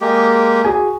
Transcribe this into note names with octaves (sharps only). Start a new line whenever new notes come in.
G#3 A#3 G4
F#4 G#4 G#5